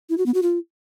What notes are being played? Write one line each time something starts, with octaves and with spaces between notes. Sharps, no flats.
E4
F#4
B3
F#4
F4